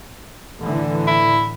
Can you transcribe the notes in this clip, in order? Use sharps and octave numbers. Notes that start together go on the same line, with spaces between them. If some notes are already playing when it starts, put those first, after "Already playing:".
A2 D3 E3
E4